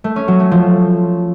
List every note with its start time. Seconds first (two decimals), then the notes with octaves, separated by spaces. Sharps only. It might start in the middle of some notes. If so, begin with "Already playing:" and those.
0.04 A3
0.16 C#4
0.28 F#3
0.40 A3
0.51 F3